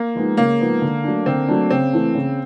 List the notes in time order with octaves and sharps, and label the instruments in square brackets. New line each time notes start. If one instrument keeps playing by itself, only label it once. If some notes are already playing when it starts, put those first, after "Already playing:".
Already playing: [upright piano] A#3
[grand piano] F3 G#3 B3 D#4
[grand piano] C#3 [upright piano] A#3
[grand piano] F3 G#3 B3 D#4
D3
F#3 A3 D4
[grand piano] D3 [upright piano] C4
[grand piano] F#3 A3 D4
[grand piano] C#3 [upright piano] C4
[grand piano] E3 A3
C#3